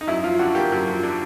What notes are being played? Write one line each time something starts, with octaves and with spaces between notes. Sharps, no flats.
D#4
F#2 E4
F3 F4
D3 F#4
A#3 G4
F#2
F3
D3